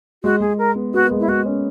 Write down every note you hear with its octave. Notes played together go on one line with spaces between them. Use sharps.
G#3 F#4
G#3 G#4
A#4
B3
B3 F#4
A#3
G#3
E4
G#3 F#4
C#4